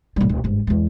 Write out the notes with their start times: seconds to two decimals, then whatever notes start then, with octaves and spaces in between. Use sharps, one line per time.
0.16 A#1 G3
0.29 D1
0.44 G1 G#2
0.67 E2 G#3